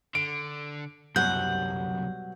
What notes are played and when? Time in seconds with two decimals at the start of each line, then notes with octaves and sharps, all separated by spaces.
0.15 D3 D7
1.16 C2 F#2 B2 F#3 G3 F#5 G6